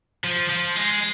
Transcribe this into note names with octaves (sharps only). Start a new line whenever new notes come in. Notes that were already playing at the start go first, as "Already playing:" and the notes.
F3
F3
G#3